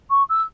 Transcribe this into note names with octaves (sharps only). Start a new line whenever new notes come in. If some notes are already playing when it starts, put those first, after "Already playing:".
C#6
E6